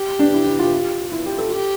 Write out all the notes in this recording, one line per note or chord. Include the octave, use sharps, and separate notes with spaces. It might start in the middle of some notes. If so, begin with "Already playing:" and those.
Already playing: G4
D4
E4
E4
F4
E4
G4
A4
F4
G4